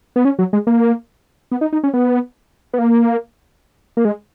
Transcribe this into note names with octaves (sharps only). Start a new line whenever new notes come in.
B3
C#4
F#3
G#3
A#3
B3
D#4
D#4
C#4
B3
B3
A#3
A#3
G#3